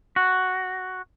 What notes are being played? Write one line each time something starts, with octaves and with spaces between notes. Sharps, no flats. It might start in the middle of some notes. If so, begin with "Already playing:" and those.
F#4